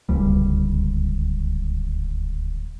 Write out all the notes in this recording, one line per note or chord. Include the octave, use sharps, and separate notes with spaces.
D1 C#2 G3